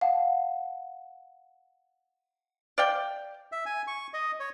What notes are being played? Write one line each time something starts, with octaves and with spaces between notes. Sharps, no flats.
F5 F#5 A5
D5 F5 G5
E5
G#5
C#6
D#5
C#5